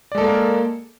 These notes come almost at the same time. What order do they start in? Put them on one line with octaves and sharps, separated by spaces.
D5 G#3 A4 A#3 A#4